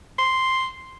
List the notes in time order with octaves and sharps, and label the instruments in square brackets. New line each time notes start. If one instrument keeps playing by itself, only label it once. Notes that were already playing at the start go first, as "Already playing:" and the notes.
[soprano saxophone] C6